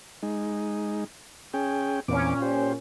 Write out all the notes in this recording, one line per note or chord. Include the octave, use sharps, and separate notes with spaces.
G#3 D#4
C#4 G#4 G5
E2 A#2 C4 C#4 D6
G4 C5